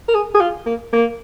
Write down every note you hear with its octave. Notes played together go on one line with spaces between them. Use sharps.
A#4
G#4
G#4
F4
A#3
A#3